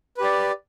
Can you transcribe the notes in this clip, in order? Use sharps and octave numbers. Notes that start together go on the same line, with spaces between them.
G4 B4 D5